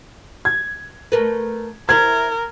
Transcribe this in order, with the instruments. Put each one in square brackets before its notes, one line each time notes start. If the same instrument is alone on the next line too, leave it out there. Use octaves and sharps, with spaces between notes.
[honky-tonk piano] G#6
[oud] A3 A#4 B4
[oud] E4 C5 [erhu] A#4 [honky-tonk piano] G#6